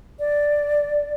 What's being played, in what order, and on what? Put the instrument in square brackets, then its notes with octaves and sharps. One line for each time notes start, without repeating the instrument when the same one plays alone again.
[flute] D5